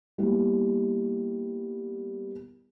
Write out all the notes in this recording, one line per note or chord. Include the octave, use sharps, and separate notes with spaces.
G3 A#3 B3 E4 G4